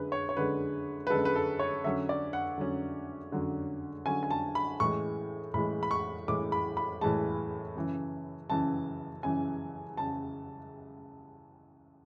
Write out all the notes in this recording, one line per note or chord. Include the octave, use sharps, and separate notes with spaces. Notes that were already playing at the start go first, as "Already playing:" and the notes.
Already playing: F#2 D3 G#3 B4
C#5
C#5
F#2 D3 G#3 B4
B4
F#2 D3 G#3 A4
B4
A4
C#5
D3 F#3 C#4 E5
D5
F#5
D3 F#3 C#4
D3 F#3 C#4
D3 F#3 C#4 G#5
G#5
A5
B5
A2 E3 G#3 C#6
A2 E3 G#3 B5
B5
C#6
A2 E3 G#3 D6
B5
B5
A2 E3 G#3 A5
F#2 C#3 E3
F#2 C#3 E3 A5
F#2 C#3 E3 G#5
C#3 A5